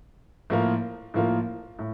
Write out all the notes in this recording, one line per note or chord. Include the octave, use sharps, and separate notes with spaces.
A2 F3 A#3 F4 A#4
A2 F3 A#3 F4 A#4
A2